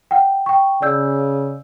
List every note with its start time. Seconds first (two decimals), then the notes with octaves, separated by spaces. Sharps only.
0.11 F#5 G5
0.46 G5 C#6
0.82 C#3 D5 E6 G6